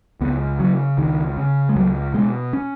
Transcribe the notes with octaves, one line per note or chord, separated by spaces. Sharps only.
C#2 B3
C#3 F#3
C#2 D#3
C#3
G#3
C#2 F#3
B2 G#3
C#4